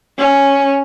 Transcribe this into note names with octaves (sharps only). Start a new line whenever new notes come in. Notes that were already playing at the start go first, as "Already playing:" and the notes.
C#4